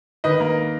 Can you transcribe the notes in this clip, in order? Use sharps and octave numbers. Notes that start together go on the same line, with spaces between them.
D#3 B4 D#5
A#3